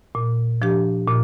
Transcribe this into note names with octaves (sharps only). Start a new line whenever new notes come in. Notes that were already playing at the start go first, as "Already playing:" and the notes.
A#2
F3 D4 G4
A#2